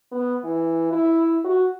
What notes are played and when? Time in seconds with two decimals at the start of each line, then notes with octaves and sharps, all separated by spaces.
0.12 B3
0.44 E3
0.92 E4
1.44 F#4